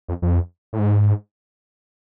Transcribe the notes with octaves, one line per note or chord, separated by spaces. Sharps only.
F2
F2
A2
G#2